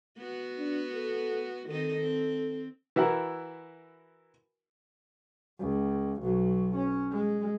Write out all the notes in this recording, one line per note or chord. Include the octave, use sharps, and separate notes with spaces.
B3 F#4
D4
A4
D#3 C4 D#4 A4
C4
E3 E4 F#4 A#4
C#2
B1 F#3
C#4
G#3